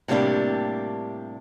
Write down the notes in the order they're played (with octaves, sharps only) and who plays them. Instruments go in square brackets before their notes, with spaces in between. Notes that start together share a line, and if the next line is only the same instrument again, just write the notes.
[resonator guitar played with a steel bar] A2 C3 G3 A#3 D4 G4